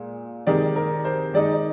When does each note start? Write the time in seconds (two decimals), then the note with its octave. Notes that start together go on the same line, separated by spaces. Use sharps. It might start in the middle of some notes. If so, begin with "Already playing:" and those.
Already playing: A#2 G#3
0.47 C3 D#3 G#3 D5
0.76 A#4
1.05 C5
1.34 D#3 G#3 D#4 D5